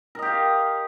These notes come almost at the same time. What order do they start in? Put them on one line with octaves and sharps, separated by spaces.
A#4 D#5 G4 F5